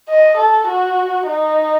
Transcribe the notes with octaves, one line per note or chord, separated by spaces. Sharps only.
D#5
A4
F#4
D#4